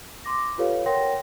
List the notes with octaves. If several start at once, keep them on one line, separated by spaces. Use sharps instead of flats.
C6 D6 A#6
F4 G4 A4 B4 C#5 F5
A#4 C#5 F#5 G5 C6 A#6